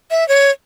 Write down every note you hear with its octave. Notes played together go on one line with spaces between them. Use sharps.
E5
C#5